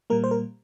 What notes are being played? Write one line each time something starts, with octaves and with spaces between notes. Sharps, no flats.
A#2 G3 A#3 A#4
C5
A#4